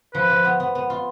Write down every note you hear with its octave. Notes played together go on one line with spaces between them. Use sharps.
F3 B4
F3
B3
B3
B3
F4